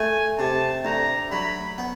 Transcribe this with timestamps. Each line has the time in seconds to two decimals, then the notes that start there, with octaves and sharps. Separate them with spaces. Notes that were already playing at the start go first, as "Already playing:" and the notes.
Already playing: A3 G#5
0.38 C3 A5
0.85 D2 A#5
1.31 F#3 B5
1.78 B3